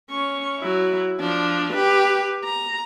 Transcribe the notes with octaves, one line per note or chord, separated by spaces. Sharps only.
C#4 C#6
F#3 E4
F3 D4
G4 B4
A#5